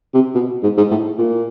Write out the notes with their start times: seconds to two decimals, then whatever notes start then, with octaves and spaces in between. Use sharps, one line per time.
0.14 C3
0.35 B2
0.63 G#2
0.77 G#2
0.91 A2
1.18 A#2